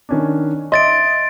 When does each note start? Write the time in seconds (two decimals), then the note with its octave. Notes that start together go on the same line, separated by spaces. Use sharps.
0.09 D#3 C#4 D4
0.72 D#5 E5 C6 A6 D7